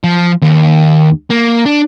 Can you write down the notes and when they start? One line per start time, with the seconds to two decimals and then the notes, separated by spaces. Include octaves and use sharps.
0.04 F3
0.42 D#2
1.30 A#3
1.66 D4